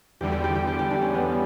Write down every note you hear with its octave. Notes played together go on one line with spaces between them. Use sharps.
E2 D3 G3 G4
G4
G4
G4
G4
G4
D4
C#4
B3